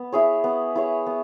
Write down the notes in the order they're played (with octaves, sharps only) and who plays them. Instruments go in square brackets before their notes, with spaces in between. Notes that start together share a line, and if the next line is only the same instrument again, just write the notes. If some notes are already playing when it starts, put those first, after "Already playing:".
Already playing: [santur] B3
E4 G#4 C#5
B3
E4 G#4 C#5
B3